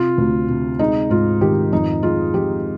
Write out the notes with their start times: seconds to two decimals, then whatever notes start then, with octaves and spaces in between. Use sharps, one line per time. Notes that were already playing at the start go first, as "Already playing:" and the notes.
Already playing: C3 F4
0.18 D2
0.48 C3
0.79 G#3 D#4
1.10 G#2 F4
1.41 D#3 G4
1.72 F2 D#4
2.03 G#3 F4
2.34 F2 G4